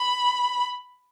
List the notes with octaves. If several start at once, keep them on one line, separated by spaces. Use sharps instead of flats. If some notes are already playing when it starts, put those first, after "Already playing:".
Already playing: B5